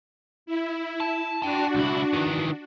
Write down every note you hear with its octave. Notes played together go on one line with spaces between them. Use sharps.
E4
A5
D4 F#4 G5 A5
C#2 E4
D#3 E3